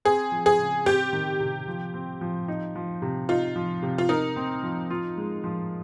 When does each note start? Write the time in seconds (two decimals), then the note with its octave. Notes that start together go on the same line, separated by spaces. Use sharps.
0.05 C4 G#4
0.32 F3
0.46 G#4
0.59 C#3
0.86 C4 G4
1.13 D#3
1.40 C3
1.68 F3
1.94 C4
2.21 F3
2.48 D#4
2.75 F3
3.02 C3
3.29 D#4 F4
3.56 F3
3.83 C3
3.98 F4
4.09 D#4 A#4
4.36 C4
4.63 F3
4.90 F4
5.17 G#3
5.44 F3